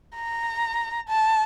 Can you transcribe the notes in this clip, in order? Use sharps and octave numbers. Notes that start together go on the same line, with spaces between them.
A#5
A5